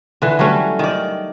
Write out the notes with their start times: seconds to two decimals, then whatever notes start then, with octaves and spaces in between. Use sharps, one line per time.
0.22 D3 E3
0.39 F#3 G3 A3 C#4
0.79 D#3 D5